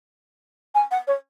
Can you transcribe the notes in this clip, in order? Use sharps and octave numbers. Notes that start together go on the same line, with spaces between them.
G#5
F#5
C#5